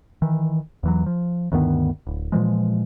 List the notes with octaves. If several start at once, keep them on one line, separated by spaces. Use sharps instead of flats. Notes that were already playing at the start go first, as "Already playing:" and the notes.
D#3 E3
E2 E3 F#3
F3
D2 G2 D#3 B3
D1
A#2 E3 F3 G#3